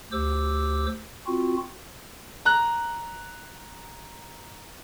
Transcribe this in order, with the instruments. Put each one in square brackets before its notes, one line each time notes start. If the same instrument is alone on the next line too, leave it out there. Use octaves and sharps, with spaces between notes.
[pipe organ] D2 G4 C5 D6 E6
C4 F4 F#4
[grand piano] A#5 F#6